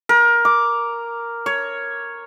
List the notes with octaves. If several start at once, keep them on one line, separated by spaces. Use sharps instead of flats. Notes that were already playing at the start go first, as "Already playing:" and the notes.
A#4
D6
C#5